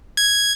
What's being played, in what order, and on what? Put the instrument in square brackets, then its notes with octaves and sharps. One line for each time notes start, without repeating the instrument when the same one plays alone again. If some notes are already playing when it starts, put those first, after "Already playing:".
[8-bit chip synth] G#6